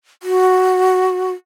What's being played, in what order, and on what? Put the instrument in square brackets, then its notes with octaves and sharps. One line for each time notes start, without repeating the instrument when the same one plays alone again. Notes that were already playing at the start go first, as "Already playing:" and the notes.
[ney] F#4